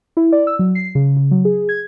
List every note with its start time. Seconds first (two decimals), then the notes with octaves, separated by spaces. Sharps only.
0.17 E4
0.32 D5
0.47 E6
0.59 F#3
0.75 C7
0.95 C#3
1.17 C#3
1.31 F#3
1.45 G#4
1.69 G#6